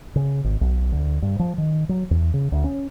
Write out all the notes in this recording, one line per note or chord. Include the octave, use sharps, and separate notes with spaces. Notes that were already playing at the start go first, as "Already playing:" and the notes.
C#3
G#1
B1
D2
G2
F3
D#3
F#3
E2
C#3
D2
C#4